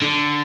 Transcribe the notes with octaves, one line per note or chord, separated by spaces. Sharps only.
D3